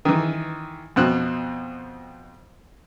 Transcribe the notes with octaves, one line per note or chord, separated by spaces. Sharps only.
D#3 E3
F2 B2 C4 F#6